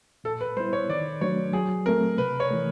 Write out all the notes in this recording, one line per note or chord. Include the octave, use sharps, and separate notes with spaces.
A#2 A4
B4
G3 B3 E4 C5
C#5
D#3 D5
F#3 A3 D4 C#5
F#3 G#4
A3 C4 A#4
C3 B4
C#5
E3 A3